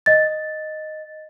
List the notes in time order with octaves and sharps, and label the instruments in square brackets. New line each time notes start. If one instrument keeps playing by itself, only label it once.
[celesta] D#5 A6